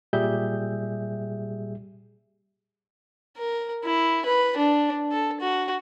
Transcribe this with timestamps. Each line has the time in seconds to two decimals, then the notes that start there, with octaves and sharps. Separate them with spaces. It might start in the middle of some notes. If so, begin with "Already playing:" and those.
0.13 A#2 G3 G4 G#4 E5 G6
3.37 A#4
3.84 E4
4.25 B4
4.57 D4
5.11 A4
5.40 F#4